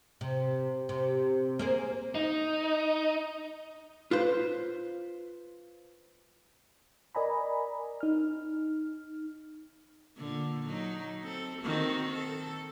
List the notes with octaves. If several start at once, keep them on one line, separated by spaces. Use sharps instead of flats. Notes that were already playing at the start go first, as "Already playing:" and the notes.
C3
C3
A#3 G#4 C5
D#4
F4 B4 C5
A#4 D5 D#5 G#5 A#5 B5
D#4 F6
A#2 D3
F#3 D#4
C4 A4
D#3 C4 F#4
A4